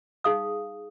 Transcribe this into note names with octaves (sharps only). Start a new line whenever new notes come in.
D#4 G#4 F5 D#6